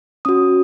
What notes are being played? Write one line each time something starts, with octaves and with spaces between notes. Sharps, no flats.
C#4 F#4 D#6